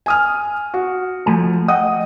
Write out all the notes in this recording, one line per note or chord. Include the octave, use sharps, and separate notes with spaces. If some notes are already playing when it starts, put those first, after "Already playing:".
G#5 D#6 F6
F#4
F3 A3 G#5
D#5 F#5 G5 D#6